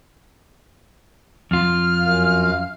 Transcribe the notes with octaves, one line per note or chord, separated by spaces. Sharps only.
F2 F4 F6
F#2 F5